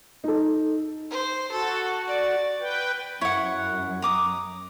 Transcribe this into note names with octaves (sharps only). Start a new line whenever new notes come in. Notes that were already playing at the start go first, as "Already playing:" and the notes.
D#4 A4
C5
F#4 A4
D5
B4 G5
F#2 E4 C#5 F#5
A#5 D6 D#6